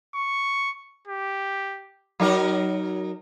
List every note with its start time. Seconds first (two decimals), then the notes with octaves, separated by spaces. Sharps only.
0.15 C#6
1.07 G4
2.20 F#3 D#4 A#4